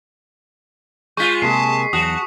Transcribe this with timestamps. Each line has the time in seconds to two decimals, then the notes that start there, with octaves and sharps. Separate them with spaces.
1.17 G#3 F4 C#6 G6 B6
1.42 C3 G#3 A#3 A#4 A5 B6 C7
1.93 E2 F#3 F#4 A5 D#6